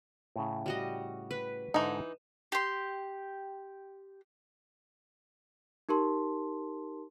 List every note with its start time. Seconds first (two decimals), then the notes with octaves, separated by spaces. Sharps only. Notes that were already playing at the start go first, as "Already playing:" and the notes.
0.36 A2 C#3
0.66 G3 F#4 D#5
1.31 B4
1.74 G#2 D3 E3 D#4 A#5
2.52 G4 C6
5.89 D#4 G4 A#4 A5 C6